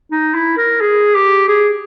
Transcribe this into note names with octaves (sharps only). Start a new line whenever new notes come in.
D#4
E4
A#4
G#4
G4
G#4